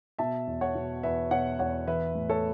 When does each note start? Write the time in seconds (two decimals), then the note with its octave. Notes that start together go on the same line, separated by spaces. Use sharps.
0.18 B2 E5 A5
0.47 E2
0.61 C#5 F#5
0.75 B2
1.03 E2 B4 E5
1.31 B2 C#5 F#5
1.59 E2 C#5 F#5
1.87 E3 B4 E5
2.15 A2
2.29 A4 C#5